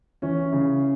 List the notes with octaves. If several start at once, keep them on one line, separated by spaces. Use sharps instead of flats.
E3 C#4
C#3